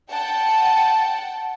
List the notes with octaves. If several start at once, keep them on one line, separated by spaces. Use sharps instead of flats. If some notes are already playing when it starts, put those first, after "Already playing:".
F#5 G5 A5